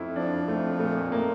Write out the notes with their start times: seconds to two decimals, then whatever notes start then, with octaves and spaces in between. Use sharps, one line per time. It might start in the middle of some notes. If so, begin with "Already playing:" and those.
Already playing: F2 E4
0.16 F3 D4
0.48 F2 A3
0.80 A#2 A3
1.12 A#2 A#3